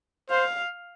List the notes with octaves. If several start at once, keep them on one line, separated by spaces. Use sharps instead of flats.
C5 F5